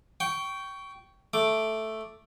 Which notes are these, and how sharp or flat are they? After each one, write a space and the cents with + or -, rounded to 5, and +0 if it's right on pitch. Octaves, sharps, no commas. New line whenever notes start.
G5 -15 C#6 +15
A3 +0 D6 +0